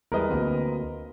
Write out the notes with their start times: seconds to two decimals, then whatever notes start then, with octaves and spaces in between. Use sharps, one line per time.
0.12 E2 G3 G#3 A#4 B4 D#5
0.30 D2 A#3 C4